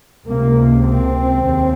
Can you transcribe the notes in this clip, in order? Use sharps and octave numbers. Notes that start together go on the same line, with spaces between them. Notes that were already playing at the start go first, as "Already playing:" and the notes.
C#2 C3 A#3
C4
D#2 C#3